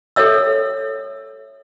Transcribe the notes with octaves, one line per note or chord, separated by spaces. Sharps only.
A4 A#4 C#5 E5 E6